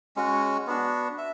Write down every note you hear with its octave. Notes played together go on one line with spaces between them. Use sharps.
G#3 C#4 F#4
B3 D4 F#4
E5